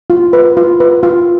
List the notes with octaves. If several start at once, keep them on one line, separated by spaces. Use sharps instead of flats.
F4
B4
F4
B4
F4